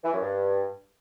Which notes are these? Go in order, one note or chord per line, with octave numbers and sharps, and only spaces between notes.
E3
F#2
G2